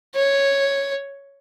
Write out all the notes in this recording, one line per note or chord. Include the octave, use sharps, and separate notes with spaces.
C#5